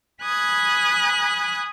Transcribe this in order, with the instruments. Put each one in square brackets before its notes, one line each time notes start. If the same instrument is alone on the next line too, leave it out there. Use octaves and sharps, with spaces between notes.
[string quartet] G#5 B5 D#6 F#6 G#6